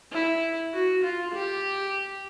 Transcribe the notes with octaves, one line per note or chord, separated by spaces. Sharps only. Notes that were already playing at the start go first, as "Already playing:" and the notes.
E4
F#4
F4
G4